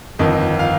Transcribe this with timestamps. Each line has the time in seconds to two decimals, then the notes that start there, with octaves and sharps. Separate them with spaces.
0.19 G1 F2 D#3 D#5
0.59 F5